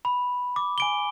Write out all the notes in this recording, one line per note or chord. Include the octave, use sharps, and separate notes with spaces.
B5
D6
G#5 D7 G7